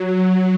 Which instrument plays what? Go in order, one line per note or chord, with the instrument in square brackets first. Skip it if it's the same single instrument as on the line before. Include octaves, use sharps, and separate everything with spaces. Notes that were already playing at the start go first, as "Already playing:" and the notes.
Already playing: [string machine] F#3